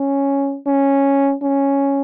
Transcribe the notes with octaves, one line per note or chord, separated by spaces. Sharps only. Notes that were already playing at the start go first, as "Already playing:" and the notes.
Already playing: C#4
C#4
C#4